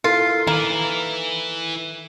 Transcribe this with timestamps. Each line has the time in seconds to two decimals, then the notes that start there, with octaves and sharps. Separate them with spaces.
0.04 E4 F4 A4 A#4
0.47 D#3 A#3 E4 B4